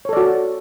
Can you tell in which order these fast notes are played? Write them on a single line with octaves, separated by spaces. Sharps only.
C#5 A4 D5 F#4